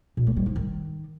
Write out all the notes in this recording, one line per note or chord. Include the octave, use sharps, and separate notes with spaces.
A#2
A3
G3
G#2
D#3